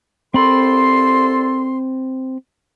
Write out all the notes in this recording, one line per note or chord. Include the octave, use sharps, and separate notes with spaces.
C2 C4 A4 B5 C6